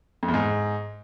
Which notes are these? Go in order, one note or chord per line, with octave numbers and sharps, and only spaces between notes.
F2
E2
G#2